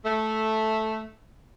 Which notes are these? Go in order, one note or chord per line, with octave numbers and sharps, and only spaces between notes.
A3